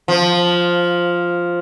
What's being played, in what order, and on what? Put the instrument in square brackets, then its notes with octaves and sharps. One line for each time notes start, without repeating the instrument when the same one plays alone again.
[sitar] F3